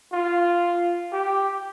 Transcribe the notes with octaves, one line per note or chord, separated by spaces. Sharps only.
F4
G4